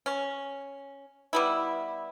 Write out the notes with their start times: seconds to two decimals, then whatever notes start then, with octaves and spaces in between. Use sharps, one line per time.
0.06 C#4
1.33 G3 B3 E4